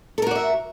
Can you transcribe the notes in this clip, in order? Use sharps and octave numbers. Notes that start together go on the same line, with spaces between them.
F#4 A4 A#4 D5 E5